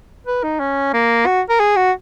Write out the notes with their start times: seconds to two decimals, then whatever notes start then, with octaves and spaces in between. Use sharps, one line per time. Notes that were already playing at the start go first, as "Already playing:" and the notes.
0.27 B4
0.44 D#4
0.60 C#4
0.94 A#3
1.26 F#4
1.50 A#4
1.60 G#4
1.77 F#4